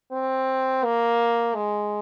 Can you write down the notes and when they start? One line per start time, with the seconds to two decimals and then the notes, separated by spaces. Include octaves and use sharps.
0.12 C4
0.84 A#3
1.55 G#3